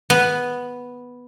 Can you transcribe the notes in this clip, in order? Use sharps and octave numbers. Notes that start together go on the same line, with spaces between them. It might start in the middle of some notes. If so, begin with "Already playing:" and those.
B3